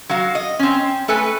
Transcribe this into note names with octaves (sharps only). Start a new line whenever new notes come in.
F#3 F#4 F5
D#5
C4 C#4
A3 A4 B4 G#5